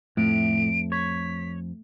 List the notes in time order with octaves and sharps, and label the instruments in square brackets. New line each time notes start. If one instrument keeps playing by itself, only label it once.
[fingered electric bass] F2 [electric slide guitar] A2 [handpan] A3 [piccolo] D7
[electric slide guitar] C#5 [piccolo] B6